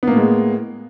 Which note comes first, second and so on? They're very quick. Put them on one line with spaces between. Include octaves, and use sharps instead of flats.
B3 A#3 A2 G#3